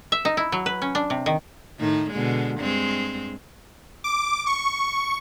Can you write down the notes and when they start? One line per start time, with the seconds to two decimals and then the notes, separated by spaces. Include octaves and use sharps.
0.12 E5
0.25 D#4
0.37 E4
0.52 F#3
0.66 B4
0.82 C#4
0.95 D4
1.10 C3
1.26 D#3
1.79 A2 D#3 D#4
2.11 B2 D3 G#3
2.60 G2 G#3 C4
4.04 D6
4.47 C#6